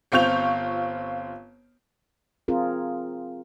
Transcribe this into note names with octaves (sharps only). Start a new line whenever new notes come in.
G1 C4 F4 C#6 G6 F7
C4 F4 G#4 A#4